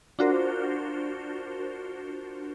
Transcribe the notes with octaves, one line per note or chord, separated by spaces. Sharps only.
D4 F4 F#4 A#4 C5